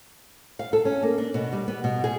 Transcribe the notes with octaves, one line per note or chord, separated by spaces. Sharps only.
F5
A4
C#4
A#3
D4
B2
G3
B3
B2
G#4